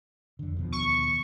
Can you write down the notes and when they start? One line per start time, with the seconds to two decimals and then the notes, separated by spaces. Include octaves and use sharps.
0.39 F2 D3
0.57 D#2 B2 F3
0.72 C#6